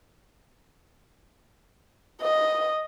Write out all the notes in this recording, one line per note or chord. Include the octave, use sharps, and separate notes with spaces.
D#5